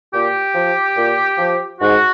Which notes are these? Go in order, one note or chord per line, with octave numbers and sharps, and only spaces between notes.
A#2 G4
F3
A#2
F3
G#2 F#4